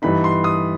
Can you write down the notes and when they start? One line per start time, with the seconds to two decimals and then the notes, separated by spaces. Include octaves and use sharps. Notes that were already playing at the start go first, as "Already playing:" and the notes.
0.02 G2 E3 B3 D#4 B5
0.24 C6
0.44 D#6